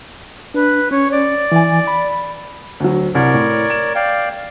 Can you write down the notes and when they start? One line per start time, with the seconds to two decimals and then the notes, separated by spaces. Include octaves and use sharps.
0.54 D4 B4
0.91 C#4 C#5
1.11 D5
1.52 E3 G#5
1.87 B5
2.80 D2 F#3
3.15 C2 A#4 C#5 D5
3.34 A2
3.70 E7
3.95 D5 F5 G5